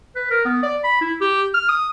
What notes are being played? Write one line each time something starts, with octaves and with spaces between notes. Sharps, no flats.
B4
A#4
B3
D5
B5
E4
G4
F6
D#6